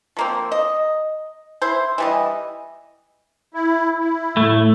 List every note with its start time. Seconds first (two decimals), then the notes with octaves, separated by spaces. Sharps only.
0.17 F3 A#3 C4
0.52 D#5
1.62 E4 C5
1.98 E3 G3 D#5
3.54 E4
3.99 E4
4.37 A2 A3